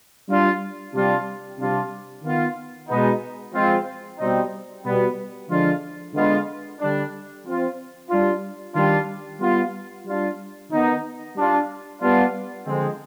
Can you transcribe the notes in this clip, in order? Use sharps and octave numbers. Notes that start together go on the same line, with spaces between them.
G3 D4 F4
C3 G3 D4 F4
C3 G3 D4 F4
D#3 B3 F4
B2 G#3 B3 D#4
F3 G#3 C4 F4
B2 G3 C4 D#4
B2 G3 B3
D3 F3 G#3 D4 F4
D3 G#3 B3 F4
D3 G3 D4
F3 C4 F4
G3 D4 F4
D#3 G3 D4 F4
G3 B3 F4
G3 D4 F4
D#3 B3 D#4
G3 D4 F4
G3 B3 D4 F4
D3 F3 G#3 C4